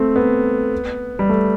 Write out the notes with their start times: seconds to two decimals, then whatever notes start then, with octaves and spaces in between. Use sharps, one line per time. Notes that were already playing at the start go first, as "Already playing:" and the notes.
Already playing: A3 C4
0.16 B3
1.19 G3
1.29 A3